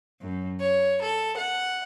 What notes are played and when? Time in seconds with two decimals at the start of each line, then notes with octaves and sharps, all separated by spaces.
0.20 F#2
0.59 C#5
1.02 A4
1.37 F#5